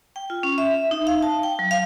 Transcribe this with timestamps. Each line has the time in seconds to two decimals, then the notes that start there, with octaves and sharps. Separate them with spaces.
0.16 G5
0.30 F4
0.43 C#4
0.58 E5
0.91 D#4
1.07 F5
1.23 A5
1.43 G5
1.59 F#3
1.71 F5